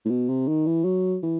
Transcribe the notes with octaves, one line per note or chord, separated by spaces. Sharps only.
A2
B2
C3
D#3
E3
F#3
E3